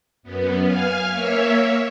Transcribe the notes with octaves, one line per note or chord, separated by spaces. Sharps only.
F#2 B3
F5 G#5 F6
A#3 C#5 E5